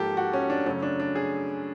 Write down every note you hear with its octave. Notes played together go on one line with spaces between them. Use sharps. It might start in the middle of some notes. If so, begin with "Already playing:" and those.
Already playing: G#2 F3 A#3 G4 A4
F#4
C#4
D4
F#2 C#3 F#3 A3 C#4
D4
D4
G#4